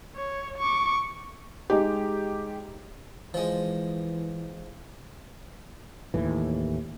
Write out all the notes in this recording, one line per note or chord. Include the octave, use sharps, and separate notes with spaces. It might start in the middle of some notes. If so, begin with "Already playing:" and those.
C#5
C#6 D6
G#3 D#4 G4
E3 F3 G#3
D#2 A2 E3